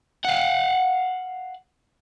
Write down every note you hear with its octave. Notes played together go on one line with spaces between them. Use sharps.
F5 F#5